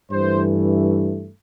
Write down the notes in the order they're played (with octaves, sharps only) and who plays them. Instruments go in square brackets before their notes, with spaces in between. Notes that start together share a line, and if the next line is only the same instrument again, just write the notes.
[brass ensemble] G2 E3 A3 C5